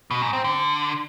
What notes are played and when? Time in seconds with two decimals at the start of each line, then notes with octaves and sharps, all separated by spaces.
0.11 B2
0.22 G#2
0.33 C4
0.44 D3